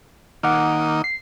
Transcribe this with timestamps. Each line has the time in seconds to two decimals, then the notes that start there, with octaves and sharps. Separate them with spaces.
0.43 D#3 A#3 D#4 F#5 D6 F6
1.04 C7